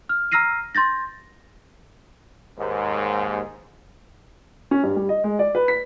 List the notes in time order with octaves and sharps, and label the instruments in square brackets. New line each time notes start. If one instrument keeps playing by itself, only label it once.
[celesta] F6
A#5 E6 F6 A#6 C7 D#7
C6 G6 A6 A#6
[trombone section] D#2 G#2
[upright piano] C#4
G2
G3
D#5
G#3
D5
B4
B6